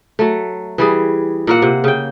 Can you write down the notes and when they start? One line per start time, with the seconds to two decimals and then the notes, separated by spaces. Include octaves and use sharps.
0.19 F#3 A3
0.78 E3 G3 G#4
1.47 A#2 A#3 F#5
1.62 C3
1.84 C#3 G5